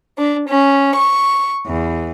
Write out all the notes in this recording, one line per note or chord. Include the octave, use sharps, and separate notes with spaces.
D4
C#4
C#6
E2